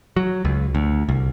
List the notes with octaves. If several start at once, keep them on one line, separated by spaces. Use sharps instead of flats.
F#3
C#2
D2
C2